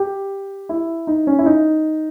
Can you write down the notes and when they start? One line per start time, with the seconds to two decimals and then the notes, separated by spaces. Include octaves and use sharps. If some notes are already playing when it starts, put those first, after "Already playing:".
Already playing: G4
0.69 E4
1.07 D#4
1.27 C#4
1.39 E4
1.46 D#4